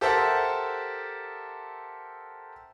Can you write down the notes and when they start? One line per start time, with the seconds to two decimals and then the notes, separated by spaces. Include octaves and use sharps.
0.01 G4 A4 A#4 C5 E5 F#5